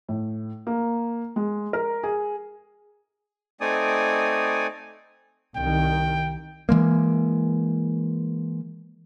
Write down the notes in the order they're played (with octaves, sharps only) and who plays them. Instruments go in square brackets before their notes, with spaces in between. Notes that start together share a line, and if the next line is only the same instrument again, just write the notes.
[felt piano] A2
A#3
G#3
A#4
G#4
[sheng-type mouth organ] A3 C4 D#4 D5 G#5 D#6
[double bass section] C2 D#3 [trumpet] G5
[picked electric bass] E3 G#3 A#3